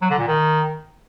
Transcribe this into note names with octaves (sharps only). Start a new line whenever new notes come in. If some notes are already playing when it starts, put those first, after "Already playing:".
F#3
D3
A#2
D#3